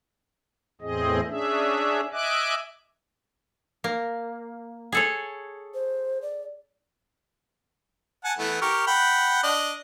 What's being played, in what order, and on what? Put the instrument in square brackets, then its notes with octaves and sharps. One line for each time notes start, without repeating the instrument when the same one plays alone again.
[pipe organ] E2 A2 C4 G#4 D#5
C#4 D4 G#4 E5
D#5 E5 G#5 D6 F#6
[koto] A#3
G#4 A4 C#5
[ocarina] C5
D5
[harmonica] F#5 G#5 A5
E3 A3 B3
G4 A#4 C#6
F#5 G5 B5
D4 D#5